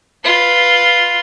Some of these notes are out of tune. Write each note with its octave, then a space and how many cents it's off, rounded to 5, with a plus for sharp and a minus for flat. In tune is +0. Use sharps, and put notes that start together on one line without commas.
F4 +0 B4 +0